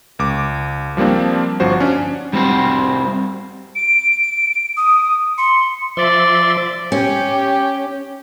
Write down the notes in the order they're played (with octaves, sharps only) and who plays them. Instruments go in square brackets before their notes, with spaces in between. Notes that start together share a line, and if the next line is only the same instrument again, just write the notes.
[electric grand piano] C#2 D6
F3 G3 A#3 C4 D4
G1 F3 F#4 C5
C#4 D4
[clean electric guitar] G3 C4 F#4 C5
[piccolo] D7
[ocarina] D#6
[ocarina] C6 [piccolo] C#7
[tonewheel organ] F3 E5 C6 [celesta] C5 [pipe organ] D5
[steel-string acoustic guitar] C#4 [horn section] G4